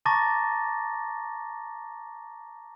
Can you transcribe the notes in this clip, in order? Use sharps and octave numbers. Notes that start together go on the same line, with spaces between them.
A5 A#5 C#6 D6 A6 A#6